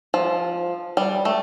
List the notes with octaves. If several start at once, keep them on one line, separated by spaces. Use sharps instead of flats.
F3
G3
A3